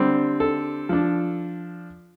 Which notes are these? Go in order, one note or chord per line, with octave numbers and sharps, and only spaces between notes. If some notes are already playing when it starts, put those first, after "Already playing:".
Already playing: D3 G3 C4
A4
F3 D4